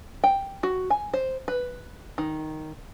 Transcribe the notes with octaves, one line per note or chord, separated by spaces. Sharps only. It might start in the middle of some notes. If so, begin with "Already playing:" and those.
G5
F#4
G#5
C5
B4
D#3